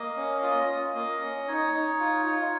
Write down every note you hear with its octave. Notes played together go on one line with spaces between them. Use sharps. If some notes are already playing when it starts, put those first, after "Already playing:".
Already playing: A#3 D#5
C#4
F4 D#5
F4
A#3
C#4
D#4 C#5
D#4
F4
F4